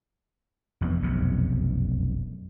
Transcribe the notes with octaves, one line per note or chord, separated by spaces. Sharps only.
F1 F2 E3 B3
F1 B1 F#2 C3